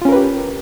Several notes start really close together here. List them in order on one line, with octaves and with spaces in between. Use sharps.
F4 C#4 A#4 B4 G4